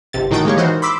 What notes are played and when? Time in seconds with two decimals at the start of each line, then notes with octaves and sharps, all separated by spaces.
0.13 G1 C3 A6
0.31 A2 D#3 D#4 F#4 G5 A6
0.45 G#3 A#3 G4 C#5
0.57 E3 D#4 F#4 A#4 C5
0.82 B5 C6 D6 E6 B6